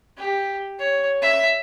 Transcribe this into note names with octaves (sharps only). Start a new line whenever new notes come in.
G4
C#5
E5